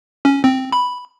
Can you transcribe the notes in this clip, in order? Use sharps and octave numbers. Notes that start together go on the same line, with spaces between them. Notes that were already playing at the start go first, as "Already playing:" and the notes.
C#4
C4
B5